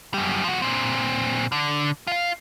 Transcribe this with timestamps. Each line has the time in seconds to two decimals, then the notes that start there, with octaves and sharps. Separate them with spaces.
0.14 F#2 G3
0.44 F3 F#4
0.62 A#2 C4
1.52 D3
2.07 F4 F5